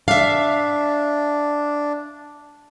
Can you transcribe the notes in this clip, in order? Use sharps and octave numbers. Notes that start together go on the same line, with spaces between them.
D4 E5 F5